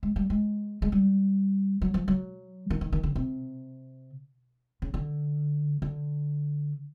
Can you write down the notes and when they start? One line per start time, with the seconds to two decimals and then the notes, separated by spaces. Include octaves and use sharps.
0.03 G#3
0.16 G3
0.30 G#3
0.82 G#3
0.92 G3
1.82 F#3
1.94 F3
2.08 F#3
2.70 D#3
2.81 D#3
2.92 D#3
3.03 D3
3.15 C3
4.82 C#3
4.94 D3
5.82 D3